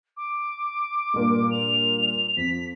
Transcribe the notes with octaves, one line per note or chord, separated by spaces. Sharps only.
D6
G2 A#2 A#3
F7
F2 B6